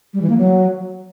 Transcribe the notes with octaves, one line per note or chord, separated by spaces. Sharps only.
G3
E3
A#3
F#3